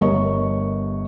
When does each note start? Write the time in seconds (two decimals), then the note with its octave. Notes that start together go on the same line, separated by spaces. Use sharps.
0.01 G1 A#4 C#5 D#5 C#6